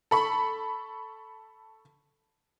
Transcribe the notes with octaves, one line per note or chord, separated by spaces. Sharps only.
A4 B5 C#6